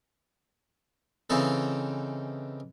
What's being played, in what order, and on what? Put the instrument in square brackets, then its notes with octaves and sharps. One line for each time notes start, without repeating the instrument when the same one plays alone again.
[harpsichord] C#3 E3 C4 D#4 A4